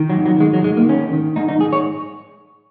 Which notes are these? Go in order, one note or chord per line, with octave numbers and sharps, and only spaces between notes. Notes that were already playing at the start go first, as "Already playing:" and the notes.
Already playing: D#3
F#3
G#2
F#3
D#3 G#3
F#3
G#2 G#3
A#3
D#3 C#4
D#3
G#2 D#4
D#4
G#2 G#4
C#5